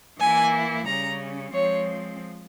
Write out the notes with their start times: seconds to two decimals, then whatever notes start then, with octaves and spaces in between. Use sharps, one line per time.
0.20 E3 A#3 E4 G#5
0.86 C#3 G3 C#4 A#5
1.53 F3 G#3 C4 C#5